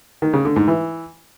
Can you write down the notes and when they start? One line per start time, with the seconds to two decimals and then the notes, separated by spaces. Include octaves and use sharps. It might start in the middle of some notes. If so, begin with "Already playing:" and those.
0.22 D#3
0.33 C#3
0.45 D3
0.56 G#2
0.68 E3